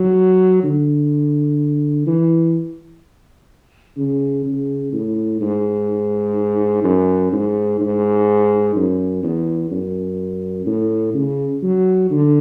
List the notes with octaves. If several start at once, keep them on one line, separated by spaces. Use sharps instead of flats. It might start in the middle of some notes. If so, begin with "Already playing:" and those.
Already playing: F#3
D3
E3
C#3
C#3
A2
G#2
F#2
G#2
G#2
F#2
E2
F#2
A2
C#3
F#3
D3